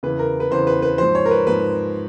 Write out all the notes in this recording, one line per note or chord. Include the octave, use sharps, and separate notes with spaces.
E2 C#3 E3 B4
A#4
B4
E2 C#3 E3 C5
B4
B4
G#2 F3 C5
C#5
A#4
B4
G#2 F3 B4